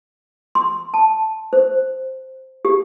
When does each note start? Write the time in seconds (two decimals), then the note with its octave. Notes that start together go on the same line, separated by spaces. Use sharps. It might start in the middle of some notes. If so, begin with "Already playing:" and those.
0.55 C6
0.94 A5
1.53 C5
2.65 G4